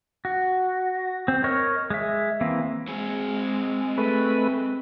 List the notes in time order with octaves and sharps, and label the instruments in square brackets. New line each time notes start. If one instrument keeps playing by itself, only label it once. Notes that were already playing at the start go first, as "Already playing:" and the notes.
[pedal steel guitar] F#4
C4
A#4 C#5 D#5 C#6 F6
G#3 E5
E3 A#3 C4 E4
[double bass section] G#3 [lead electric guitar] C4 G#4
[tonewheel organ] A3 B4